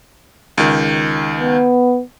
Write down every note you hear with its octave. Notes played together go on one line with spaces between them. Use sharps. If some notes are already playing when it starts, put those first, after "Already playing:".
C#2 D#3
B3